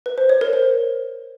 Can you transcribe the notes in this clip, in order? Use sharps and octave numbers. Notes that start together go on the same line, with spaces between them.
B4
C5
C#5
A#4
C5